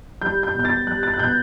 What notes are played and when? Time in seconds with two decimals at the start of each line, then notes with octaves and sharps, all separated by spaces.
0.21 G3 G6
0.43 G6
0.54 B2
0.59 G6
0.65 A6
0.87 G3 F#6
1.03 A6
1.14 F#6
1.19 B2 G6